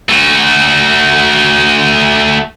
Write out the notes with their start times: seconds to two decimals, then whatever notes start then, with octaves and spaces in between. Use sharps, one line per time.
0.09 A3 F#4